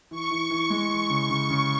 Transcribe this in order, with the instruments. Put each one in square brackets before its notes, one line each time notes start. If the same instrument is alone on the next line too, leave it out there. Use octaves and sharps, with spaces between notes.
[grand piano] E3 [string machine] C#6
[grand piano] E3
E3
G#3
E3
C#3
C#3
C#3